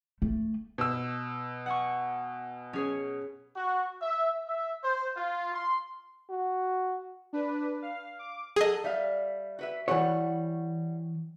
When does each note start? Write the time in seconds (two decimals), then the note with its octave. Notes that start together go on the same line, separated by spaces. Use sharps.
0.22 A3
0.78 B2 E6
1.66 F#5 G#5 C#6
2.73 C#4 G#4 C#5
3.56 F#4
4.02 E5
4.47 E5
4.84 C5
5.17 F4
5.54 C6
6.30 F#4
7.33 D4 B4
7.82 F5
8.19 D6
8.56 F#3 G#4 A4 D#5
8.84 G3 E5 F5
9.59 F#4 B4 E5
9.88 E3 G3 F#4 C#5 F#5